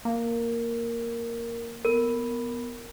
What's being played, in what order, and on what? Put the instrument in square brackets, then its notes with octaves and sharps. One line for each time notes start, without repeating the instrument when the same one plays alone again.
[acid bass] A#3 [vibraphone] A#4
[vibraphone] B3 [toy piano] A#4